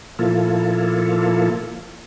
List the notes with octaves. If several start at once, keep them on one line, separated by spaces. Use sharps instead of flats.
A#2 F3 A#3 E4 F4 A4